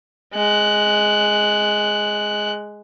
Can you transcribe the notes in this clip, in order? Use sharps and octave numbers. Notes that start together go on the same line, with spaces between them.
G#3 F#6